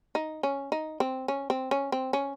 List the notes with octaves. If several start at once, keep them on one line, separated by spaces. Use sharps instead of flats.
D#4
C#4
D#4
C4
C#4
C4
C#4
C4
C#4